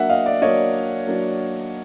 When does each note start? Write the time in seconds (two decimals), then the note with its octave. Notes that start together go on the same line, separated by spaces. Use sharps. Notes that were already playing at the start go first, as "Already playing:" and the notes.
Already playing: F#3 A#3 D4 E5 F#5
0.09 D#5 F5
0.26 D5 E5
0.42 F#3 A#3 D4 C#5 D#5
1.07 F#3 A#3 D4